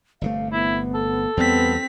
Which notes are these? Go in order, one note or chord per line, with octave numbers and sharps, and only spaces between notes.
G1 C3 A3 F5
B3 E4
A4
E2 G3 B3 C4 B6